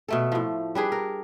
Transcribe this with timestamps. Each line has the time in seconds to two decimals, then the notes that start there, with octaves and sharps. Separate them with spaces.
0.08 B2 A3 A4
0.32 A2 F3
0.75 G3 D4 G#4 B4
0.92 A#4